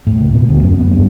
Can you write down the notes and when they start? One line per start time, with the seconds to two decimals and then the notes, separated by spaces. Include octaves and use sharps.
0.07 A2
0.21 C#2
0.34 B2
0.49 D2
0.63 F#2
0.79 B3
0.93 G2